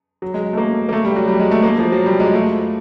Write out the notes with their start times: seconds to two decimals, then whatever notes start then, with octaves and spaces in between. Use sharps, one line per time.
0.22 F#3
0.34 G#3
0.53 A3
0.57 A#3
0.89 A#3
0.93 A3
1.05 G3
1.16 F#3
1.28 G3
1.40 G#3
1.51 A3
1.63 A#3
1.78 F3
1.92 F#3
2.06 G3
2.20 G#3
2.34 A3